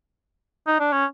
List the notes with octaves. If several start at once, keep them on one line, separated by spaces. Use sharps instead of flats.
D#4
D4
C#4